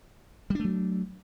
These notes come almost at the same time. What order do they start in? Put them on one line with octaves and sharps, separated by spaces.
G3 D4 A3 F#3